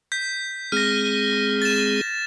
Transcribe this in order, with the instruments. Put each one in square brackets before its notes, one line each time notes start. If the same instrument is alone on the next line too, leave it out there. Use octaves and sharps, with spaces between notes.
[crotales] G6 B6
[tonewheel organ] G#3 C4 G#4 [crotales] F6 A#6
[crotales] A6 E7